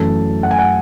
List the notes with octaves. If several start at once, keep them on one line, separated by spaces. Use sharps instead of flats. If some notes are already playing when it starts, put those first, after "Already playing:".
Already playing: F#2 E3 A3 A4
F#5
G#5
F#5